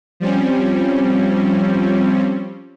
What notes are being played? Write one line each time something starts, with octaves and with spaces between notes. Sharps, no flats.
F3 G3 C4 C#4